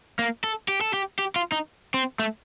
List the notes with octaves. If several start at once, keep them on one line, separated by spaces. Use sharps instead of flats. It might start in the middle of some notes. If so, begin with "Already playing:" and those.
A#3
A4
G4
A4
G4
G4
F4
D#4
C4
A3